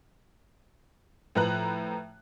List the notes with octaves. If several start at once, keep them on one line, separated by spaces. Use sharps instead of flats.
A2 F3 B4 A#5 F#6